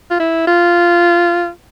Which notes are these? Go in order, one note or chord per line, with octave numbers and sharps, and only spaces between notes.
F4
E4
F4